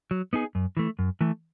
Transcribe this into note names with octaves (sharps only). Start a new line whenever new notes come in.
F#3
B3 D#4 G#4
F#2
E3 A3
F#2
E3 A3